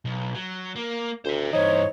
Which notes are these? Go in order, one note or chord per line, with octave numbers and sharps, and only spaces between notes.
B1
F#3
A#3
D2 C5 E5
G2 E3 D#4 C5 C#5